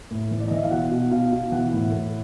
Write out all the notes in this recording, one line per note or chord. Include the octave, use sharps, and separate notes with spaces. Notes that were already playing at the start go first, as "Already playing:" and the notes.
A2
E3
D5
D#5
E3 E5
F5
B2 F#5
B2
B2 F5
B2
E3 F#5
A2
A2